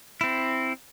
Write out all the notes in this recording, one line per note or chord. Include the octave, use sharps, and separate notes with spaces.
C4 E4